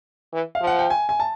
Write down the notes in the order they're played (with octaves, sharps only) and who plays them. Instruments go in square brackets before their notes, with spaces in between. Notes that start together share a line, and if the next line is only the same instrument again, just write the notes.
[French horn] E3
[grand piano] F5
[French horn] F3
[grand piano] F#5
G5
G#5
G#5
A5